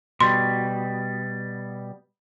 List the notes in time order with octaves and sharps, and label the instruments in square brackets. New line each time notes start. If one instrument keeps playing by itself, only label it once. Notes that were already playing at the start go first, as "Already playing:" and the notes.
[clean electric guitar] B2 G3 [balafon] C6